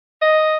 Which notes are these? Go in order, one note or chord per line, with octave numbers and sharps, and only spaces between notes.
D#5